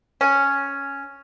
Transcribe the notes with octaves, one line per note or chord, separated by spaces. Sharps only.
C#4